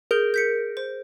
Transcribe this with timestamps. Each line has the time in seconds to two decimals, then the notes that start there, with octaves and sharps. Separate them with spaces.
0.11 G#4 A#4 G6 G7
0.34 G6 B6 C#7
0.77 C5